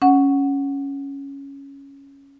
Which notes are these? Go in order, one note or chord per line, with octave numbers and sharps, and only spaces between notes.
C#4 F#5